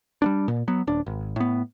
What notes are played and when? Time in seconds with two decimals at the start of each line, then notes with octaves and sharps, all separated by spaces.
0.22 G3 B3 D4
0.48 A#2
0.68 F#3 B3
0.87 D#1 D4
1.06 G#1
1.36 A2 B3